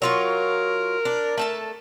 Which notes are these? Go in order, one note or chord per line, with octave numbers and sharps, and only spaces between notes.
F#3 F4 A#4 C#5
D4
A3 A4 A5